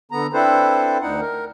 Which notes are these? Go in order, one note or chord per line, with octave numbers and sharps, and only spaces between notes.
D3 B3 A#5
C4 D4 E4 A4 B4 C5
D2 D4 D#4 F#5
A#4